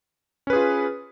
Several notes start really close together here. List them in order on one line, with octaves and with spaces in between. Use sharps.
C#4 B4 G#4 F4